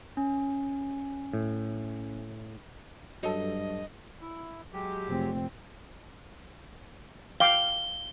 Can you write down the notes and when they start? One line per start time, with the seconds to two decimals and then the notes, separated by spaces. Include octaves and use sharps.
0.17 C#4
1.34 A2
3.23 G2 F#3 A4 D#5
4.21 E4
4.73 F#3 G#3 G4
5.08 F1 C4
7.40 F5 G5 D6 G7